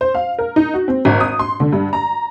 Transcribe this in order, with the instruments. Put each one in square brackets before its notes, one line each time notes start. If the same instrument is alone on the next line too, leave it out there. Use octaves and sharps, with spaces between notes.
[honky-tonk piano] C5
F5
A#4
D#4
F#4
C4
G#1
D#6
C6
D3
G2
A#5